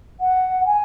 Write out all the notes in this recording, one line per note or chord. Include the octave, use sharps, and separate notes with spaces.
F#5
G#5